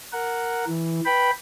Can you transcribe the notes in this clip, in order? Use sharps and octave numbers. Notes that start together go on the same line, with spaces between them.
A#4 F#5
E3
B4 G5 B5